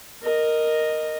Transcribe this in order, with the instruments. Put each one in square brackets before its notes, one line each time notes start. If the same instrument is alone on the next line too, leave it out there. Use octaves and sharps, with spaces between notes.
[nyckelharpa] A#4 D#5